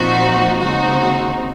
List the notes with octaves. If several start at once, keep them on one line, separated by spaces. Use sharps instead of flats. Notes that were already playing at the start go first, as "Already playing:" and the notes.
Already playing: A#2 F3 C4 D#4 F#4
D#2 C#3 G#3 C4 D#4 F#4